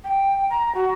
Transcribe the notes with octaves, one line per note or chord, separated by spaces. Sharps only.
G5
A#5
F#4